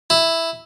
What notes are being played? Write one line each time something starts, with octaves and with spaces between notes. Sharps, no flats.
E4